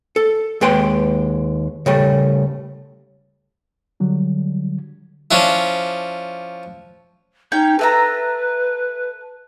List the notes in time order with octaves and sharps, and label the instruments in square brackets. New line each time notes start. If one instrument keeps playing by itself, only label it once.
[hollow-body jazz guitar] A4
D#2 G#3 B4 G5 C6
C#3 G3 A3
[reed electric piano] D3 F#3 G3
[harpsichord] F3 C#4 D4 E4
[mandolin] C#4 G5 G6 [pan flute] D#4
[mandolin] A4 E5 A#5 [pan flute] B4